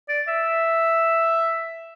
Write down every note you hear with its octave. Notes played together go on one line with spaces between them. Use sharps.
D5
E5